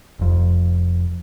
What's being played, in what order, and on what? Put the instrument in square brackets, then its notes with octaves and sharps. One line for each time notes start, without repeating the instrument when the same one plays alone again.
[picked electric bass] F1 F2